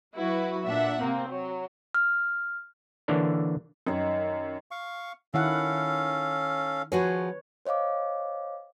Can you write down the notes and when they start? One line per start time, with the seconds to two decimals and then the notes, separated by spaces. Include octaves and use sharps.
0.14 F#3 E4 F#4 B4
0.66 A#2 D4 E5 F#5
1.00 C3 A#3 C4
1.29 F#3
1.94 F6
3.08 D3 E3 A#3 D4 C#5
3.87 F#2 D#3 C#5
4.71 F5 C#6
5.34 D#3 C#4 E4 A4 F5 F#5
6.92 F3 F#4 G#4 B4 C#5
7.65 C5 C#5 D#5 F5 D6